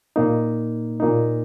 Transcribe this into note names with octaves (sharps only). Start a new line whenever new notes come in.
A#2 A#3 D#4
A#2 A#3 D#4